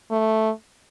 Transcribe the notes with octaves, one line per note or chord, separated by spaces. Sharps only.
A3